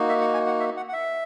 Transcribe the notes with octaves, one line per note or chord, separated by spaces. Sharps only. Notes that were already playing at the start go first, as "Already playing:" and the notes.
Already playing: A#3 D#4 F#4
E5
F#5
G#5
F#5
E5
F#5
F#5
E5